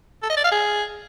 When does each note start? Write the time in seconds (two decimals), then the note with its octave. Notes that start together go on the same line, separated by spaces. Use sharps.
0.23 A4
0.30 D#5
0.37 D5
0.44 F5
0.51 G#4